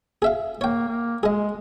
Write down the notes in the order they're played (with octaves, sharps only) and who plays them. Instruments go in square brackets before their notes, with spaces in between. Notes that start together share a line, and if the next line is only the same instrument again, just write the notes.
[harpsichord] G#4 E5 F5
[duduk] A#3 [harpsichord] C#5 G5
[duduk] A#3
[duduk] G#3 [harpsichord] G#4 D#5